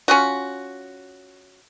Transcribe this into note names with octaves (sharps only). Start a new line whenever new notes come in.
C#4 F4 F#4